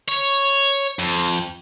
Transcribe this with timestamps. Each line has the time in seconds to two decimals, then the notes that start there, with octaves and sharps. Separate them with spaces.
0.08 C#5
0.99 F2